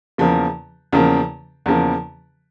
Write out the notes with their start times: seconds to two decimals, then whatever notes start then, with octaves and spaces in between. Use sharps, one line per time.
0.18 E2 C#3 F3 A#3
0.92 E2 C#3 F3 A#3
1.66 E2 C#3 F3 A#3